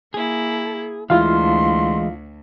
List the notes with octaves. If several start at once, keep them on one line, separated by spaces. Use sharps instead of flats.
A#3 E4 G#4
D2 E3 G#3 E4 F4 F5 C6